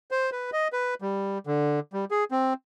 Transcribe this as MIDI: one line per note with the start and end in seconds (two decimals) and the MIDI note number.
0.11 0.30 72
0.32 0.50 71
0.53 0.68 75
0.73 0.94 71
1.02 1.38 55
1.47 1.80 50
1.93 2.05 55
2.11 2.25 68
2.31 2.53 60